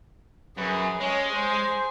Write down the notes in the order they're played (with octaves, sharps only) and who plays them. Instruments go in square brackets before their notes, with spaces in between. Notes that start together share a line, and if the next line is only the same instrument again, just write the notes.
[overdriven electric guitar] F#2 [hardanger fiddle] G#4 [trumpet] B4
[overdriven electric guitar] G#3 [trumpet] C#4 [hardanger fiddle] C#5
[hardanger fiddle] G#4 G#5 [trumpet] C5